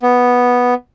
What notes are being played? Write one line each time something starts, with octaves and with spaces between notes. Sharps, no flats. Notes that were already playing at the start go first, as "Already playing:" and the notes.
B3